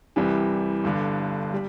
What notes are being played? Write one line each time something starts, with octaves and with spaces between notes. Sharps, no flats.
C2 C3 E3 G3
G1 G2 D3
G3